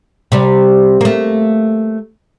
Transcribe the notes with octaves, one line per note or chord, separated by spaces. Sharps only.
C3 G3
A3 A#3